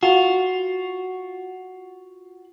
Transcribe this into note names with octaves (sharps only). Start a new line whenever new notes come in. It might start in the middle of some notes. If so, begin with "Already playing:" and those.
F4 F#4